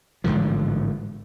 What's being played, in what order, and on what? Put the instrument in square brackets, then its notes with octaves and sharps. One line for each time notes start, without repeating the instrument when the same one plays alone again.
[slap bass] A1 G#2 D3 F3